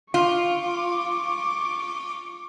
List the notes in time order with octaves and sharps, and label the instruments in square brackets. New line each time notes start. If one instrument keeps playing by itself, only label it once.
[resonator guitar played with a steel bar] F4 [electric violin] C#6 D6